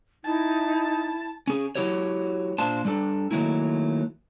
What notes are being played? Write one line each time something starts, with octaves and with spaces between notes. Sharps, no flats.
D#4 E4 A5
C#4 G#4
F#3 E4 F#4 G4 C#5
A#2 D4 F4 C5 A5
G3 D4 A4
D#3 F#3 A3 A#3 E4